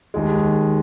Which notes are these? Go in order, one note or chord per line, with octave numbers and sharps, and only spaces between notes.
D#2 D#3 G#3